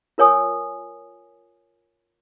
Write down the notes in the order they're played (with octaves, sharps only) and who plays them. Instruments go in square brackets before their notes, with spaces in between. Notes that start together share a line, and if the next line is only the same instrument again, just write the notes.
[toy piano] F4 A#4 C#5 G#5 D#6